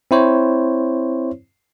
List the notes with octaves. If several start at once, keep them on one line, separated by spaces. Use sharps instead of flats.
C4 E4 C5 C#5